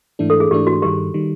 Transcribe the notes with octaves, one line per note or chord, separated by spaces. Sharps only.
G#2 E3 A3 D4
A4
G#4
G#2 E3 A3 D4 G4
F#4
G2 D#3 G3 G4
D#3 G3